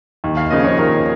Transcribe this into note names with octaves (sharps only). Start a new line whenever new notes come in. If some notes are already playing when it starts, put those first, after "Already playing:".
D#2
F5
C#3 F3 A#3 D#5
C#5
D#2 A#4